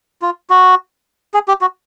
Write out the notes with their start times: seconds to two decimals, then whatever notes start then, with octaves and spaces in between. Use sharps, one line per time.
0.22 F4
0.50 F#4
1.34 G#4
1.48 G4
1.61 F#4